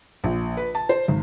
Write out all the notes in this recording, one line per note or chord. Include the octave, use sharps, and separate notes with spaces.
A#1
B4
A5
C5
G#1